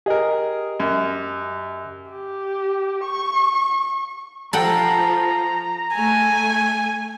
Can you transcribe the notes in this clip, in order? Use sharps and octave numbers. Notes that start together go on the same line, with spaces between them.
G4 G#4 A#4 D#5
F#2
G4
C#6
F3 A4 F#5 G5 A#5
A3 G#5